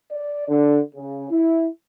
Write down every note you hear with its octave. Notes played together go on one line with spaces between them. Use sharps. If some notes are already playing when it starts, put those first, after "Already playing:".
D5
D3
C#3
E4